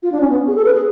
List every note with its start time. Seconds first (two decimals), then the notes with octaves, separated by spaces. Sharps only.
0.03 F4
0.12 D4
0.21 C#4
0.30 B3
0.47 G#4
0.56 A4
0.65 B4
0.73 G#4